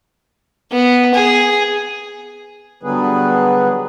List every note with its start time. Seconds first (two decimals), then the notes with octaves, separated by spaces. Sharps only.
0.72 B3
1.14 G#4
2.83 D3 F#3 G3 B3 G#4 B4